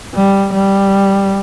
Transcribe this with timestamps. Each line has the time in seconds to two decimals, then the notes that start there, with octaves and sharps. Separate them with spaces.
0.14 G3
0.53 G3